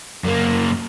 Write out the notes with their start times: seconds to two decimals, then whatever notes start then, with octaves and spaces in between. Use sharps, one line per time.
0.24 F#2 A#3